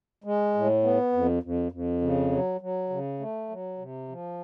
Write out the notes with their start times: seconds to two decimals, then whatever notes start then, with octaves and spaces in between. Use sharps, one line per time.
0.24 G#3
0.54 A2
0.83 B3
1.13 F2
1.43 F2
1.72 F2
2.01 C#3
2.31 F#3
2.61 F#3
2.90 C#3
3.19 A3
3.49 F#3
3.78 C3
4.08 F3